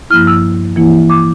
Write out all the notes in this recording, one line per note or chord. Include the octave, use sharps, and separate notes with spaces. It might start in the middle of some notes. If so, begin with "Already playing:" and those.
G2 F3 A#3 E4 F6
E6
E3 A#3 E4
D6